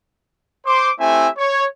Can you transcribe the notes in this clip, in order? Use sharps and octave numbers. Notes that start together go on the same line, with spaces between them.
C5 C6 D6
A3 C4 E4 G4 E5 G#5
C#5